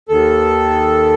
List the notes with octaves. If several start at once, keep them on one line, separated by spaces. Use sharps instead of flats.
D#2 D#3 A4